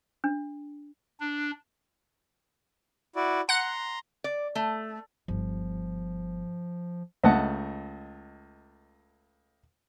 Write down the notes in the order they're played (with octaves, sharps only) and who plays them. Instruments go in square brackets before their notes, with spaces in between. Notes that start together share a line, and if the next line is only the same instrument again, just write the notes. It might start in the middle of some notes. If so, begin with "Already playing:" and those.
[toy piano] D4
[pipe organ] D4
[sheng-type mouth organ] E4 F#4 D5
[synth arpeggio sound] F#5 F#6 [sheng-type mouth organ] A#5 C6
[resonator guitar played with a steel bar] D5
A3
[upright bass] G1 [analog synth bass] F3
[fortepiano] C#2 A3 D#5 F#5 A5